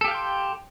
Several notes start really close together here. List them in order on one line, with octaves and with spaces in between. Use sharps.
A4 G4 F5 G5 C6